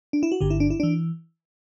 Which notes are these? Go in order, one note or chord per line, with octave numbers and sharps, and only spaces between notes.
D4
E4
F#4
G1 G2 D3 G4
E4
D4
E4
E3 D4